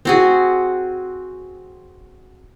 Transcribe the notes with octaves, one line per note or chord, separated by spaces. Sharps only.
C4 F#4 G#4